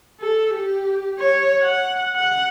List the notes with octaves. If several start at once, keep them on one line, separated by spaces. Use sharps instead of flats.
A4
G4
C#5
F#5
F#5